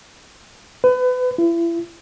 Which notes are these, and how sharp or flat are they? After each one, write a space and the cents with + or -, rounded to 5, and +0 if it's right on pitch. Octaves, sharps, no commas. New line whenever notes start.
B4 +30
E4 +35